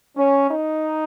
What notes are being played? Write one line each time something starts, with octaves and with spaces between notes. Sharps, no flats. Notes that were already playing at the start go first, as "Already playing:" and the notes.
C#4
D#4